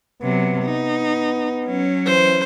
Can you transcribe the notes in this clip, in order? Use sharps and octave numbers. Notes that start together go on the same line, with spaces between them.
C3 F#3 B3
D#4
F#3 C#4
E3 C5